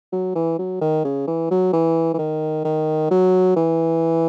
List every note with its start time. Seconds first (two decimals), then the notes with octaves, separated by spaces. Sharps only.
0.12 F#3
0.35 E3
0.58 F#3
0.81 D#3
1.04 C#3
1.27 E3
1.51 F#3
1.73 E3
2.14 E3
2.19 D#3
2.65 D#3
3.11 F#3
3.56 E3